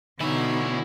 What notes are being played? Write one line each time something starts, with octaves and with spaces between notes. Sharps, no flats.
B2 D3 E3 D#4 E4 C#5